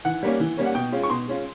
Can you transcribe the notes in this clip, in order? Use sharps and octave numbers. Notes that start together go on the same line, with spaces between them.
E3 F#5
G3 A#3 C#4
E3
G3 A#3 C#4
F#5
B2 G5
G#3 C#4 F4
C#6
B2 C6
G#3 C#4 F4